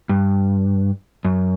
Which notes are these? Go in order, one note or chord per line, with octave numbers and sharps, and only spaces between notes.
G2
F#2